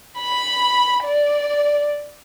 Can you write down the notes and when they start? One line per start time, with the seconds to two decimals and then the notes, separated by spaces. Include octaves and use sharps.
0.20 B5
1.05 D5